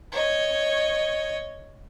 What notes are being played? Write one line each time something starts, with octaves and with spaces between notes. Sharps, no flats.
C#5 D#5